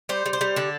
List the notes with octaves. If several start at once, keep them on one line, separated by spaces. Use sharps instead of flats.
G3 C5
G3
C5
G3
D3 A4